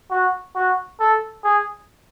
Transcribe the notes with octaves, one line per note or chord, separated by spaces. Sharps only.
F#4
F#4
A4
G#4